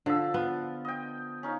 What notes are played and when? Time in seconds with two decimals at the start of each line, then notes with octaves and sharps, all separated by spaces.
0.06 D3 F3 A5 E6
0.34 B3 F4
0.85 D#5 G5
1.43 C#4 D#4 F5